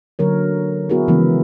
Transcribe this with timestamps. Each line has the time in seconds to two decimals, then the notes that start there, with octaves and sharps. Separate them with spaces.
0.19 D3 F#3 A#4 C#5
0.89 B3 E4 F#4 G#4 A#4
1.08 C#3 E3 F3 G#3 B3